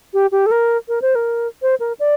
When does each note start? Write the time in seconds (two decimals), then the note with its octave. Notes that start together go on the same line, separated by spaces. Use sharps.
0.14 G4
0.32 G4
0.46 A4
0.51 A#4
0.88 A#4
1.02 C5
1.15 A#4
1.62 C5
1.80 A#4
2.00 D5